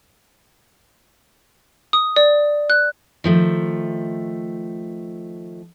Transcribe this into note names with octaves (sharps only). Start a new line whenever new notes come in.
D#6
D5
F#6
D#3 F3 A3